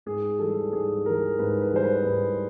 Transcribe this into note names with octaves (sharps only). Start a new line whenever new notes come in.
G#2 G#4
E3 G3 A4
G#2 G#4
E3 G3 A#4
G#2 B4
B4
E3 G3 C5
B4
G#2